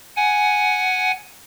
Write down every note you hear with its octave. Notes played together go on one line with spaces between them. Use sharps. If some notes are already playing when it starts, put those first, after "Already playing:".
F#5 G#5